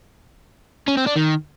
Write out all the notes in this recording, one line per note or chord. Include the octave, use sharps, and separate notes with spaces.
C#4
C4
D4
D#3